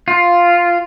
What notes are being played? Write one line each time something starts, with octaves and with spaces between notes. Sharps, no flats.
F4